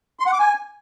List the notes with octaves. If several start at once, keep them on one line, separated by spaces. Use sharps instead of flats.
C6
F#5
D6
G#5